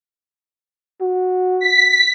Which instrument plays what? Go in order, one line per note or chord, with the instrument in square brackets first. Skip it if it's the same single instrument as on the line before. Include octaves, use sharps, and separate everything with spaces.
[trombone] F#4
[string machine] B6